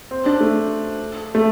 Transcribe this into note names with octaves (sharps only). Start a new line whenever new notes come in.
C4
D4
A3
A3